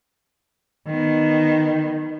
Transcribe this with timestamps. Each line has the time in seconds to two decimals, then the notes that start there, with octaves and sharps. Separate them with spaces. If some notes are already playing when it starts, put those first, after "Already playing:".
0.87 D#3 B3